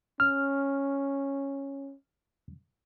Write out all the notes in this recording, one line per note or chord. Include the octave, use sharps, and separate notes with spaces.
C#4 F6